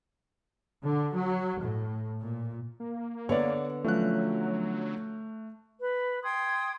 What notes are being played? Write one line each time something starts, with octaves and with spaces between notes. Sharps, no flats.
D3
F#3
A2
A#2
A#3
D3 B3 C#5 D5
F3 F#3 A3 C#4 F#6
B4
G5 C6 D#6 G#6